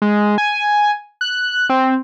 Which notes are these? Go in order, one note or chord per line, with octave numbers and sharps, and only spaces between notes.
G#3
G#5
F#6
C4